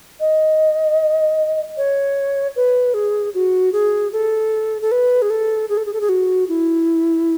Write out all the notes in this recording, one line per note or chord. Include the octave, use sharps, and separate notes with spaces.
D#5
C#5
B4
G#4
F#4
G#4
A4
A4
B4
G#4
A4
G#4
A4
G#4
A4
G#4
F#4
E4